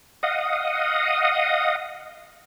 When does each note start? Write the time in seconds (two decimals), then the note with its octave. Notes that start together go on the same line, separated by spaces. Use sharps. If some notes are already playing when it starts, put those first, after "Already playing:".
0.23 D#5 F5 F#5 D#6